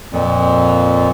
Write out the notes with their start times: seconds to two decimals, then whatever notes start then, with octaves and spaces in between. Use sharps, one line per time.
0.13 F2 A#2